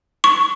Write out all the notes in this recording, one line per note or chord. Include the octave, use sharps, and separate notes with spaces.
C#6